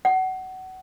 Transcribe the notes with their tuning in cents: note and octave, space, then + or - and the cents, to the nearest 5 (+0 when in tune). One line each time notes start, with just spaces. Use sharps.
F#5 +25